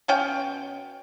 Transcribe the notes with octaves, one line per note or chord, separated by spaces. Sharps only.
B2 C#4 G5